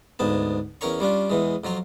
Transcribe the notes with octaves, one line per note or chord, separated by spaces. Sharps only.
D2 G#2 B3 A5
E2 C#4 A#4 C#5 A#5 C#6
G3 C#4 D4 F4
E2 E3 G#3
F2 F#3 F4 A#5